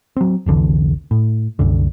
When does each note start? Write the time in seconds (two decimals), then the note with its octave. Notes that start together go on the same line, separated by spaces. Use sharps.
0.17 F#3 C4
0.46 F1 C2 D3 E3
1.11 A2
1.59 C2 F#2 D3